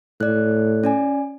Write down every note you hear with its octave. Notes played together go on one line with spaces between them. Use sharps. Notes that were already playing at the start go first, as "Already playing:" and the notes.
A2 D5 F#6
C#4 D5 G#5